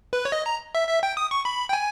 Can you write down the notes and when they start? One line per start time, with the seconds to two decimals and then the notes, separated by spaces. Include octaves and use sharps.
0.13 B4
0.25 C#5
0.32 D#5
0.46 A#5
0.75 E5
0.89 E5
1.03 G5
1.17 D#6
1.31 C#6
1.45 B5
1.69 G5
1.73 G#5